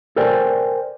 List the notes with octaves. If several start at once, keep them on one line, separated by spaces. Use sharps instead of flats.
A4 A#4 C5 D5 G5 G#5